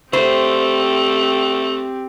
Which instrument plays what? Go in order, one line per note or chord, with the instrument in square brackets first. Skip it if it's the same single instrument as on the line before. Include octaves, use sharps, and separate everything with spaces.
[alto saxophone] A3 [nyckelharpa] C4 G4 [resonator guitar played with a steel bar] C5